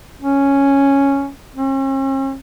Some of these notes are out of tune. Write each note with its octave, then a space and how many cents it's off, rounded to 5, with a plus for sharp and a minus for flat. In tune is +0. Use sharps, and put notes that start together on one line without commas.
C#4 +0
C#4 -45